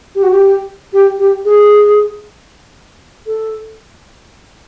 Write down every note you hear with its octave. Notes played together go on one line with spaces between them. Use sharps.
G4
F#4
G4
G4
G4
G#4
A4